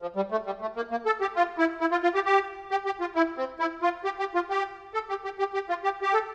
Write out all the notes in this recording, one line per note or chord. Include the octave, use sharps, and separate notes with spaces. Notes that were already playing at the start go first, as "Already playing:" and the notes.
F3
G3
A3
G3
A3
A#3
A#3
A4
G4
F4
E4
E4
F4
F4
G4
G4
G4
G4
F4
E4
C4
E4
F4
G4
G4
F4
G4
A4
G4
G4
G4
G4
F4
G4
G4
A4